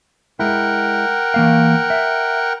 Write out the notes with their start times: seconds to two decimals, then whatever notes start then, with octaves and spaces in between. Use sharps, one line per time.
0.39 G#3 E4 A#4 F#5 G5
1.34 E3 A#3 F5
1.90 E5